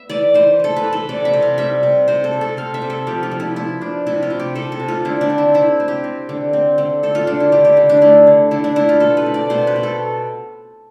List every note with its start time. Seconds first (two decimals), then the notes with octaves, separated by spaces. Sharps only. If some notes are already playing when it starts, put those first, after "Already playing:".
Already playing: B3 E5
0.10 E3 D5
0.34 E3 C5
0.60 E3 A4
0.77 B4
0.84 E3
0.93 A4
1.09 C3 D5
1.25 E5
1.33 C3
1.42 F5
1.58 G3 E5
1.83 C3
2.08 C3 C5
2.24 A4
2.33 C3
2.41 A4
2.57 C4 F5
2.74 E5
2.82 C3
2.90 A4
3.07 F3 G4
3.23 F4
3.32 F3
3.40 E4
3.56 B3 E4
3.81 F3 D4
4.06 C3 E4
4.23 F4
4.30 C3
4.40 G4
4.55 C3 A4
4.72 A4
4.80 C3
4.88 F4
5.05 D3 E4
5.21 D4
5.30 C4
5.38 E4
5.54 C4 E4
5.80 C4
5.88 G4
6.04 C4
6.29 D3
6.53 C4
6.78 D3
7.03 C4 A4
7.15 F4
7.27 D3 D4
7.40 E4
7.52 D3 G4
7.65 G4
7.77 D3
7.90 D4
8.02 A3 E4
8.27 D3
8.51 D3 E4
8.64 D4
8.76 D3 E4
8.89 F4
9.00 B2 A4
9.17 B4
9.26 C4
9.34 D5
9.50 B2 C5
9.67 B4
9.76 B2
9.83 A4